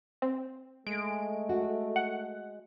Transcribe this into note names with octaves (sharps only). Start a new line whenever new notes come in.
C4
G#3 A3 D7
F#4
F#5